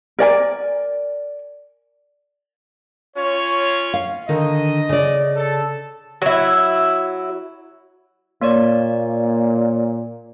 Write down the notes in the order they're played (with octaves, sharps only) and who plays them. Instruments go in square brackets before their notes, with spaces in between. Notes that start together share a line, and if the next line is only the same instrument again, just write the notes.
[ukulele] A#4 D5 G#5
[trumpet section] C#4 F4 C#5
[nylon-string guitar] F5
[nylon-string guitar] D3 D#3 [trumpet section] D#5
[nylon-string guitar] C#3 D5
[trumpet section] A4
[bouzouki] F#3 E4
[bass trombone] A#2 [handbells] A#3 C#5 D5